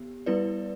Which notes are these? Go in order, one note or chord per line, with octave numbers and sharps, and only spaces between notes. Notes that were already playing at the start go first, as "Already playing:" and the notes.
Already playing: D3 B3 G4
G3 B3 E4 B4 D5